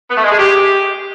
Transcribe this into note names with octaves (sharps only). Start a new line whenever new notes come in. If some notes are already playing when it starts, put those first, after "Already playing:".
B3
A3
G#3
G#4
G4